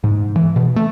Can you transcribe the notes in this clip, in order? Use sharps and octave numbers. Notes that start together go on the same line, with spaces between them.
G#2
E3
B2
A3